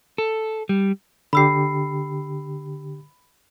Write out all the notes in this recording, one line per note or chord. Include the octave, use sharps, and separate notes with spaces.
A4
G3
D3 G4 B5 E6 C7